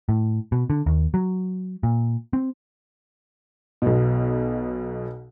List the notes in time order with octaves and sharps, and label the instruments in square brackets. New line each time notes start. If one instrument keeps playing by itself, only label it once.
[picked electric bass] A2
B2
D3
D#2
F#3
A#2
C4
[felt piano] B1 B2